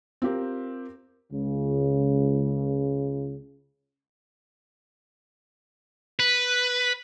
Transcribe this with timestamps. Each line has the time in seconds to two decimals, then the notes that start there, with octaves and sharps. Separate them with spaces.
0.22 C4 F4 G4 A#4
1.32 C#2 C#3
6.20 B4